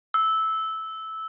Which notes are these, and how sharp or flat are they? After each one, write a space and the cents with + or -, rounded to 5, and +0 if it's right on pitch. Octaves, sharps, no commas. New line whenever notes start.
E6 -10